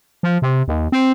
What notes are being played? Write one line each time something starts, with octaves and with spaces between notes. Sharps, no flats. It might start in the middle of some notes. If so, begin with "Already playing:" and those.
F3
C3
D#2
C4